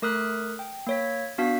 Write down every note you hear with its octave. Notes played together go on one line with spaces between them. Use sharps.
A3 A#4 D#6 F6 F#6 B6
G5
A#3 C#5 B6
B3 D4 F#4 F5 B6